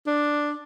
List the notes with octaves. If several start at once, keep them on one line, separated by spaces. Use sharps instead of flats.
D4